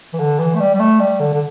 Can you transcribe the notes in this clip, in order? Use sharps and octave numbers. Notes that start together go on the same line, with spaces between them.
E3
D3
E3
A3
G3
G3
A3
G3
D3
D3